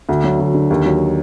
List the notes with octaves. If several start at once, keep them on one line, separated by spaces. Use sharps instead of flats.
D2
F#3
D2
D3
D#2
F#3